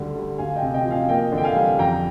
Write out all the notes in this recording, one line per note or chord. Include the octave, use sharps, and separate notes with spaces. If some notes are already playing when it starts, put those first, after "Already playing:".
Already playing: D2 D3 G3
G3
D2 F5 G#5
D#5 G5
C3
D#5 G5
F3
F5 G#5
A#3 D#5 G5
D3
G5
F5 G#5
G3
F2 G5 A#5